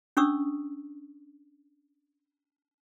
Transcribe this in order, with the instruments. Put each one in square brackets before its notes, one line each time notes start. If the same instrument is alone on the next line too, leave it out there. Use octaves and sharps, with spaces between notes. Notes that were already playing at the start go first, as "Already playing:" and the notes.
[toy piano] C#4 D4 C#6 D#6 E6